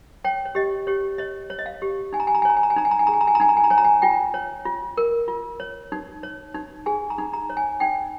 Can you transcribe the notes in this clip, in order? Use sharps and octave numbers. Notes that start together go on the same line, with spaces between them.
C#5 G5
C#5
G4 D#5
G4 C#5
C#5 D#5
C#5
D#5
F5
G4
D#4 G#5
A#5
G#5
A#5
G#5
C#5 A#5
G#5
A#5
G#5
D#4 A#5
G#5
A#5
G#5
G#4 A#5
G#5
A#5
G#5
A#5
D#4 G#5
A#5
G#5
A#5
C#5 G#5
A#5
G#5
F4 G5
C#5
F4
A#4
F4
C#5
D#4
C#5
D#4
G#4 G#5
A#5
D#4
A#5
C#5
G#5
D#4 G5